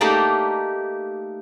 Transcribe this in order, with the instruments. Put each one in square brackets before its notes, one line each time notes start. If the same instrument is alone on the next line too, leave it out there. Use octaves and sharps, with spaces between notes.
[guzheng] A3 A#3 D#4 G4 D5 A5